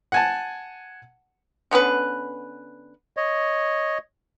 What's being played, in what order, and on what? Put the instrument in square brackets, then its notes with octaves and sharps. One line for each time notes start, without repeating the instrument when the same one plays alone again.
[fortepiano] F#5 G#5 A5
[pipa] D3 B3 C#4 B4
[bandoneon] C#5 D#5